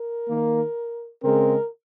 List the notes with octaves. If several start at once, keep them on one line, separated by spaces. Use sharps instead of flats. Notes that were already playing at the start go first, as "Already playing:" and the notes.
Already playing: A#4
D#3 A#3
C#3 G#3 C4 A#4